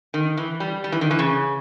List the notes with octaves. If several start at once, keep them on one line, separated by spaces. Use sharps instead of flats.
D#3
E3
G3
G3
E3
D#3
E3
C#3